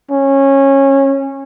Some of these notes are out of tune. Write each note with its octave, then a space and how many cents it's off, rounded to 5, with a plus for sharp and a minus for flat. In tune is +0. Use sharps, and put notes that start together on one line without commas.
C#4 -20